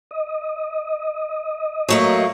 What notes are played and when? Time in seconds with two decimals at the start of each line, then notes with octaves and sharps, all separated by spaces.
0.11 D#5
1.89 F#3 A3 A#3